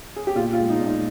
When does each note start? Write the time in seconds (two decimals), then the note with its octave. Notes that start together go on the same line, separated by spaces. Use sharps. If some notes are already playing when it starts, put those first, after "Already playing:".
0.16 G#4
0.27 G4
0.35 A#2 F4
0.53 F4
0.59 G#3
0.70 D#4
0.81 A#2 D#4